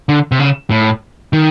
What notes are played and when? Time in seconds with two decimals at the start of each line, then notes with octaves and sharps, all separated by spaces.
0.09 D3
0.32 C3
0.39 C#3
0.70 A2
1.33 D#3